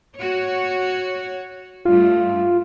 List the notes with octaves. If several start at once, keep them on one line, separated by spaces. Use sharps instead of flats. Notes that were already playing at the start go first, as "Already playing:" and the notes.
F#4 C#5
G2 A3 F4